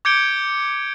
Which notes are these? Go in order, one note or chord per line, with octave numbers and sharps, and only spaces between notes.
D6 G6 G#6 C#7 D7 G7